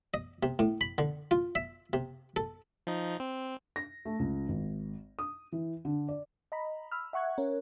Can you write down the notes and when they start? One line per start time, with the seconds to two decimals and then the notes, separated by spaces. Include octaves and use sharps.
0.14 D#5
0.43 C3
0.59 A2
0.81 B5
0.98 D3
1.31 F4
1.55 E5
1.93 C3
2.36 A4
2.87 F3 D#4
3.20 C4
3.76 A#6
4.05 A3
4.19 C#2
4.48 G#1
5.19 D#6
5.52 E3
5.85 D3
6.08 D5
6.52 D#5 A#5 B5
6.91 B5 E6 F6
7.13 E5 F#5 C#6 F#6 G#6
7.38 C#4 A#4 C#5